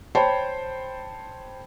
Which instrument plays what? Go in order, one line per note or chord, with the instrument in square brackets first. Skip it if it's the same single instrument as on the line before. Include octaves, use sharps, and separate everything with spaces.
[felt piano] C5 C#5 G5 A5 B5